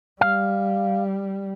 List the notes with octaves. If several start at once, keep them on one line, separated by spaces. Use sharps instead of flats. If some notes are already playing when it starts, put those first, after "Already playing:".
G3 F5